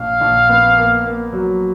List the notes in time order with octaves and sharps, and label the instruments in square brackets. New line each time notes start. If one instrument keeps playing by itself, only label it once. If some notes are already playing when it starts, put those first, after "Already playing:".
Already playing: [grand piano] A#1 [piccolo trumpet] F5
[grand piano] A#1
B3
A#3
A#3
F#3